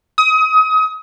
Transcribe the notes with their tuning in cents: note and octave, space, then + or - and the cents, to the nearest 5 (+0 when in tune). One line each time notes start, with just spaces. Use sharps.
D#6 +30